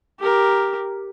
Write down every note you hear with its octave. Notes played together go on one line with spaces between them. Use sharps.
G4 A#4